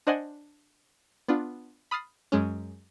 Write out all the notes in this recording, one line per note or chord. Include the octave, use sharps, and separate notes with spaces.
D4 C5 D5 D#5 F#5 G#5
B3 D4 F4
B5 D#6 F6 A6 C7
F#2 G#3 C#4